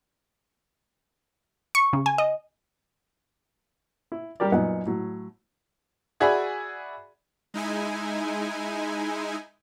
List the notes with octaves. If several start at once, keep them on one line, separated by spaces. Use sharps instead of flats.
C#6
C#3
G#5
D#5
E4
G3 G4 A#4 D5
F#2 A#2 B3 D#4 F#5
A2 F#3
F#4 G#4 D5 E5 G#5 B5
G#3 D#4 E4 G#5